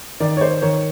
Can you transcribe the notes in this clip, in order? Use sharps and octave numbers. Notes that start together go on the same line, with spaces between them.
D#3 D5
C#5
C5
D#3 C#5